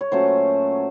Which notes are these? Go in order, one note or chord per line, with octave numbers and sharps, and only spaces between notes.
C#5
A#2 F#3 A3 C#4 C5